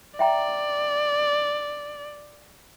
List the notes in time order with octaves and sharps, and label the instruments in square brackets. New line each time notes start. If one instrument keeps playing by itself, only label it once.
[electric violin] D5 [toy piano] E5 G5 A#5